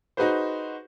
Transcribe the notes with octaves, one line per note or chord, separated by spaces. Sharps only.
D#4 F#4 G#4 B4 C5